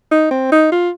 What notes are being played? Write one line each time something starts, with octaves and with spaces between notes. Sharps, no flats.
D#4
C4
D#4
F4